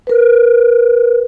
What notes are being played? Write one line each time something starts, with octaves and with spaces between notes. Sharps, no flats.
A#4 B4